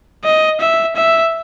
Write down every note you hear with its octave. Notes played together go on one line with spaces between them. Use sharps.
D#5
E5
E5